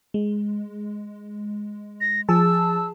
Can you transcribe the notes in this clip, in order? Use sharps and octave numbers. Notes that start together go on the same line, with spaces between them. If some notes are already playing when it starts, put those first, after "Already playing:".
G#3
A#6
F3 G#4 A5 E6